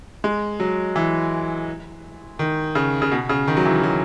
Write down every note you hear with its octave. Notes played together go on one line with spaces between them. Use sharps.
G#3
F#3
E3
D#3
C#3
C#3
B2
C#3
D#3
F#3
E3
F#3